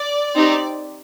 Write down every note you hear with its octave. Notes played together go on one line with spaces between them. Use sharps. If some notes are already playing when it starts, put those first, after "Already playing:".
Already playing: D5
C4 D#4 G4